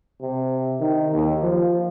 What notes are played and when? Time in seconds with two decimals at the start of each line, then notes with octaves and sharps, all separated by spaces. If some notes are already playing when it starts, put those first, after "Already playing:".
0.22 C3
0.80 D#3
1.13 D#2
1.43 F3